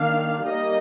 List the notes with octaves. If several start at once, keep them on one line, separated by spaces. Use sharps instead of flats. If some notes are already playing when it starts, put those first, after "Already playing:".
Already playing: D#3 A#3 D4 F5
G3 A#3 D#4 D#5